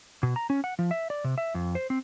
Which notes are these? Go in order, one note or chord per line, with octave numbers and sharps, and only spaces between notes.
B2
A#5
C#4
F#5
F3
E5
D5
C3
E5
F2
C5
C4